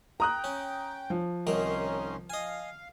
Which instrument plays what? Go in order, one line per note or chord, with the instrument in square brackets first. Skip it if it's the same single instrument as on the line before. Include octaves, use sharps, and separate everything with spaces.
[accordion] G5 [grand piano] A#5 D#6 F#6
[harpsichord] C#4
[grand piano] F3
[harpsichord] C2 D#3 A#4 [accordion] C#4 D#4 C6
[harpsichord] D#5 G#5 [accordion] F5